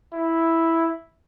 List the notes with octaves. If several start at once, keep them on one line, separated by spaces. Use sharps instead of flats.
E4